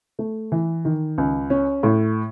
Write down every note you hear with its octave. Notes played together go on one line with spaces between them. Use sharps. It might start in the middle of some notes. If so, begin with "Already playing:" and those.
A3
E3
D#3
C#2
C#4
A2